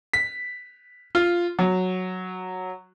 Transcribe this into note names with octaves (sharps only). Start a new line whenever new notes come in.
B6
F4
F#3